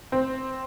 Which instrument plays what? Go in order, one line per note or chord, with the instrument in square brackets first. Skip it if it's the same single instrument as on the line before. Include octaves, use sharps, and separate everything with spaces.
[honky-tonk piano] C4